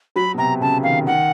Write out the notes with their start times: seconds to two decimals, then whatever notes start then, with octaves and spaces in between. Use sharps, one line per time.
0.16 F#3 B5
0.34 B2
0.38 C3 A#5
0.61 C#3 A5
0.83 D#3 F5
1.07 D#3 F#5